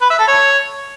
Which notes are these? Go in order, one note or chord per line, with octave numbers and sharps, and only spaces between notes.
B4
E5
A4
C#5